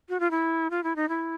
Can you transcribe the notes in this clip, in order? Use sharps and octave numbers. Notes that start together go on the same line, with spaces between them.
F#4
F4
E4
F4
E4
D#4
E4